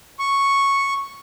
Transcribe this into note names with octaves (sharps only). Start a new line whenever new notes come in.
C#6